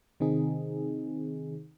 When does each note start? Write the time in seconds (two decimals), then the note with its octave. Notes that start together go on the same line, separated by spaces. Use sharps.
0.20 C3 D#3 C4 D#4 G#4